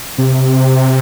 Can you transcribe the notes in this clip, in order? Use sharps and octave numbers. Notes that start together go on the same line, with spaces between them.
C3